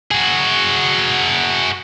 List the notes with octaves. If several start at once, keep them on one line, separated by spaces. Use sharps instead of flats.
F#4 G#4